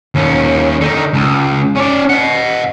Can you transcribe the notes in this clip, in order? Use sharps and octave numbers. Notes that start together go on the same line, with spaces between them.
D#2 C#4
D3 D#4
C#2
C#4 D5
D#5 F#5